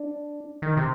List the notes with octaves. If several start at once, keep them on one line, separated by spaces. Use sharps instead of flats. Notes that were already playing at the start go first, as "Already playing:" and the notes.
Already playing: D4
D#3
C3